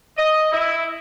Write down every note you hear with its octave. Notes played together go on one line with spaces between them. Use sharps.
D#5
E4